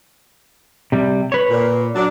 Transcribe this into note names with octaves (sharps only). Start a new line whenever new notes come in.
C3 G3
B4 C#5
A#2
F#3 D4